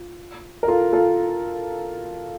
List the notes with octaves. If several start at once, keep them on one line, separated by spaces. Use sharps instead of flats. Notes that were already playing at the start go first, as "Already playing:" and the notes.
Already playing: F4
A#4
F4 A4
F4 A4